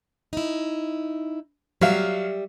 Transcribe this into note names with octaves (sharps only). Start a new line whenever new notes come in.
D#4 E4
F#3 G3 E5 F5